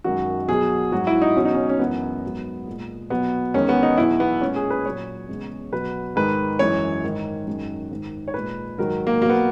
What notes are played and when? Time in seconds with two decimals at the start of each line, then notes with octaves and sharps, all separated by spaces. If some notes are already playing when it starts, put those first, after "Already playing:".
0.04 F#2 D#3 G#3 F#4
0.48 B2 F#3 G#4
0.92 G#2 F#3 F#4
1.07 E4
1.22 D#4
1.35 E2 B2 F#3 C#4
1.45 D#4
1.55 C#4
1.69 C#4
1.79 F#2 E3 G#3 B3
2.24 G#2 F#3
2.67 A#2 G#3
3.10 B2 F#3 B3
3.54 E2 D#3 G#3 C#4
3.69 B3
3.83 D#4
3.98 E2 B2 F#3 E4
4.20 B3
4.41 A#2 G#3 C#4
4.56 G#4
4.70 B4
4.86 A#2 F#3 C#5
5.28 E2 C#3 G#3
5.73 B2 F#3 B4
6.16 G#2 D#3 G#3 B4
6.59 F#2 E3 G#3 C#5
7.04 G#2 D#3 G#3
7.47 F#2 D#3 G#3
7.91 G#2 D#3 G#3
8.28 C#5
8.34 A#2 G#3 B4
8.78 G#2 D#3 F#3 A#4
9.07 A#3
9.21 B2 F#3 A#3
9.30 B3